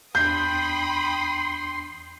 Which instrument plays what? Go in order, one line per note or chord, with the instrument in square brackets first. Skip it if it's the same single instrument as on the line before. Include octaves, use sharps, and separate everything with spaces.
[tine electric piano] E2 D4 [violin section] G5 B5 D#6 [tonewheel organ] C6 [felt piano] G6